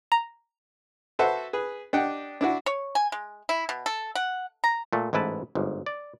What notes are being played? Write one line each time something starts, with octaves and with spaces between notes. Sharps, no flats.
A#5
F#4 A4 B4 C5 E5 F#5
G#4 B4
D4 G4 D#5 F#5 G5
D4 E4 F#4
C#5
G#5
G#3
E4
B2
A4
F#5
A#5
A#2 A3
A1 G#2 E4 B4 A5
G1 G#2
D5